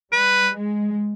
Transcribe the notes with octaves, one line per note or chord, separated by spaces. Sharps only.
G3 B4
G#3